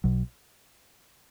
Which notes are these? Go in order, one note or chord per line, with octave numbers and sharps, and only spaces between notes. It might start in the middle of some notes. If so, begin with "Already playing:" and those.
B1 B2 F#3